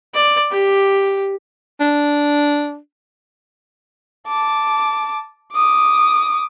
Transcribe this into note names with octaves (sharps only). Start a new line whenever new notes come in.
D5
G4
D4
A5 D6
D6 D#6